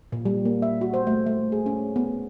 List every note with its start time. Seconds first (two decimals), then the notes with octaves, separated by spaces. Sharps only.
0.12 A#2
0.25 G3
0.45 A#3
0.62 E5
0.81 F#4
0.94 C5
1.07 A3
1.26 A3
1.52 G#4
1.66 C#4
1.96 B3